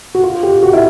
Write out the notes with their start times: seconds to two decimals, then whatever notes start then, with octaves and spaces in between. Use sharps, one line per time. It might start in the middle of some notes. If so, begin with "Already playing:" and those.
0.15 F#4
0.23 F4
0.43 G4
0.63 F#4
0.73 E4